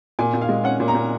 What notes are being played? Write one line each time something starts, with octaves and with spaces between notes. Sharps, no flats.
A#2 G#5
A#2
F5
G#3
C#4 F#5
A#2
A#5
A#2